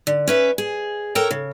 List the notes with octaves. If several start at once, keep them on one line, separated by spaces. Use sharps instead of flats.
D3
C#4 B4 E5
G#4
A4 A#4 C#5 G5 A#5
C#3